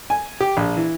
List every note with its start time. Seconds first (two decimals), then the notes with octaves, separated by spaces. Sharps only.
0.10 G#5
0.40 G4
0.57 A#1
0.76 E3